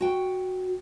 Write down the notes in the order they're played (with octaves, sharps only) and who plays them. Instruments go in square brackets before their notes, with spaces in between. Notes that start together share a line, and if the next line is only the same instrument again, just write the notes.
[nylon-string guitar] F#4 G5